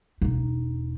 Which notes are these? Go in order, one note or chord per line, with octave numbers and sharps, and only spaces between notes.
E1 D#4